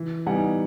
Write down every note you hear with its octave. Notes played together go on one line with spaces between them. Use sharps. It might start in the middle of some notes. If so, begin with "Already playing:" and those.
Already playing: E3
G3 B3 D#4 F#5 G#5